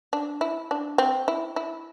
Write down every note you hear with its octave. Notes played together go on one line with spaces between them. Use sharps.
D4
E4
D4
C4
E4
E4